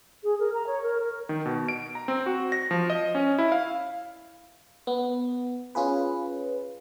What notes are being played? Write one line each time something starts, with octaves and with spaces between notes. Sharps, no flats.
G#4
A#4
A#5
C#5
A#4
A#4
D#3
B2
D7
A#5
C4
F#4
A#6
F3
D#5
C#4
E4
F5
B3
C#4 F4 G#4 B4